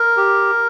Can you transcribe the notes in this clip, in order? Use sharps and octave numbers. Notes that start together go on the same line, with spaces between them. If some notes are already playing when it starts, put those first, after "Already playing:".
Already playing: A#4
G4